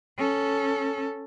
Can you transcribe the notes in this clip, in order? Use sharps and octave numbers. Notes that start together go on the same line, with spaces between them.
C#4 A4